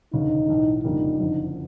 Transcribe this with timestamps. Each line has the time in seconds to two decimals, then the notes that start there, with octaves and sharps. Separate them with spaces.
0.13 E1 D2 C#3 D#4
0.48 B1 A2 E3
0.84 F#1 F2 D3 G3 A#3 D#4
1.20 F#1 F2 D3 F3